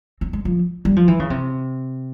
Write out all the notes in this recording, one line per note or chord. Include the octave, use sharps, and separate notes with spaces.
C4
G#3
F3
G3
F3
E3
C#3
C3